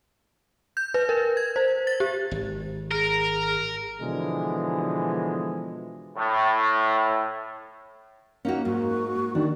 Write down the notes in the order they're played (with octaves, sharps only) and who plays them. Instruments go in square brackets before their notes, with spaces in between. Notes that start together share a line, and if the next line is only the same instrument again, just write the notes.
[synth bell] G6
B4
A#4
G#6
C5
A6
G4
[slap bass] G#1
[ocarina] G#4 [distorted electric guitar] A#4
[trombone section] B2 D3 E3 F3 G#3
A2
[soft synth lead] A#3 [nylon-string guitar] C#4 D#4 F#4
[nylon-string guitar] G#2 [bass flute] F#4
[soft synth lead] D#3 [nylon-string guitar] D4